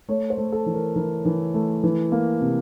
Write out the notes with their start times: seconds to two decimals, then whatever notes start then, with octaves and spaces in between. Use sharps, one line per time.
0.09 A3 C#5
0.30 C5
0.38 A3
0.52 A4
0.66 E3
0.74 A#4
0.96 E3 A#4
1.25 E3
1.54 A3
1.83 E3
2.12 A#3
2.41 C3